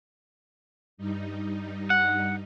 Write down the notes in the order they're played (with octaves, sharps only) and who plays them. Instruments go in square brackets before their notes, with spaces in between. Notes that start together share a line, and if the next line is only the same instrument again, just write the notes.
[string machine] G2 G3 D#4
[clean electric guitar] F#5